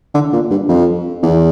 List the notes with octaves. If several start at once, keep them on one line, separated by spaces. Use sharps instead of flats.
D3
A#2
G2
F2
E2